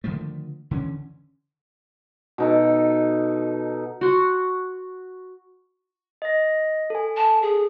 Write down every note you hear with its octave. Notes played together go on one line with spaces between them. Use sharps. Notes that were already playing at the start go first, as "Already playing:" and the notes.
D3 D#3 F3 A3
D3 E3 B3 C#4
B2 D#4 A4
F#4 C6
D#5 A#6
A4 G#5
A5
G#4